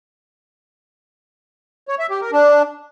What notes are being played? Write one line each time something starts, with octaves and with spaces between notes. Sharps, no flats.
C#5
E5
G4
A#4
D4